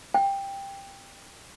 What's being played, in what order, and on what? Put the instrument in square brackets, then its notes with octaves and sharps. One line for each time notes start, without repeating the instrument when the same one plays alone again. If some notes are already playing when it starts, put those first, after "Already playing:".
[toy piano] G5